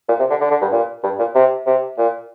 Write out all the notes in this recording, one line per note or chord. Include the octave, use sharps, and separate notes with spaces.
A#2
C3
D3
D3
D3
G2
A#2
G2
A#2
C3
C3
A#2